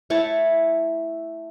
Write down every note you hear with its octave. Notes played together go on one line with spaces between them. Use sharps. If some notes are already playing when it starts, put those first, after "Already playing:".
A3 E4 C#5 A5